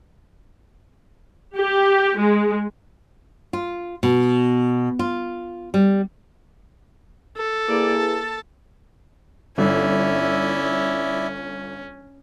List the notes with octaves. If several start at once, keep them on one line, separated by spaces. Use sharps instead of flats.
G4
G#3
F4
B2
F4
G3
A4
A#3 E4 G#4 B4 D5
A5
G1 C#4 E4 D5 E5